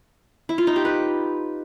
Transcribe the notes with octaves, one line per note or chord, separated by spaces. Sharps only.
E4
F4
D#4
G4
B4